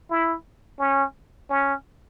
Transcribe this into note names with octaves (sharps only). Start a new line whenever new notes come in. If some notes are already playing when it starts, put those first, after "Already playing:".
E4
C#4
C#4